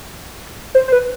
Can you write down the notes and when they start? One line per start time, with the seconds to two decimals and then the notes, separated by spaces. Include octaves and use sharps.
0.75 C5
0.88 C5
0.92 B4